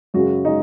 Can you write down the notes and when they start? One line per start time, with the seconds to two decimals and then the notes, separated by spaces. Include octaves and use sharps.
0.14 F#2 C#3 G#3 F#4
0.45 C#3 G#3 D#4